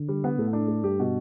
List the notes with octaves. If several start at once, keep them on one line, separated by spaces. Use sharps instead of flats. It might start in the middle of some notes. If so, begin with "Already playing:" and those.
Already playing: D3
G3
B3
A2 A3
D4
A3
G2 G4
B2